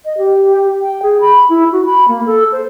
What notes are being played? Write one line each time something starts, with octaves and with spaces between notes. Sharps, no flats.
D#5
G4
G5
G#4
B5
E4
F#4
B5
A#3
A4
C5